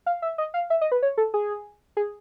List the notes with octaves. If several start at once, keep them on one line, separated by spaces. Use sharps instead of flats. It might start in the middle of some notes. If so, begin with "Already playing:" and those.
F5
E5
D#5
F5
E5
D#5
B4
C#5
A4
G#4
G#4